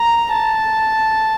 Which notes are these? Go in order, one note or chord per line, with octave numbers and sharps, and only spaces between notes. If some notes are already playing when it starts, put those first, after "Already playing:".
Already playing: A#5
A5